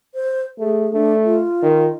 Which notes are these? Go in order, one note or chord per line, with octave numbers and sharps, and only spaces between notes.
C5
A3 G#4
A3 D4
F4
D#3